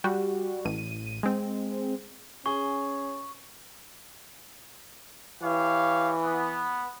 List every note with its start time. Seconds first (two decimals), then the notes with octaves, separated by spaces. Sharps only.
0.04 G3 F#4
0.65 A1 D#7
1.23 G#3 C4
2.46 C#4 G#4 C#6
5.43 E3 G4 C#5 F5
6.23 B3